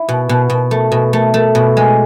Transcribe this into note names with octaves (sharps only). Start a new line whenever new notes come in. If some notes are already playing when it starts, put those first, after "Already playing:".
Already playing: E4
B2
B2
B2
A3
B2
A3
A3
B2
G#3